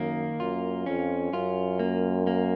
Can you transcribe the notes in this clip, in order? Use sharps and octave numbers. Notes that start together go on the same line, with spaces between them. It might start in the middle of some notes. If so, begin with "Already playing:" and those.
Already playing: F#2 D#3 A#3
F#2 F4
F2 C#4
F#2 F4
A#3
A#3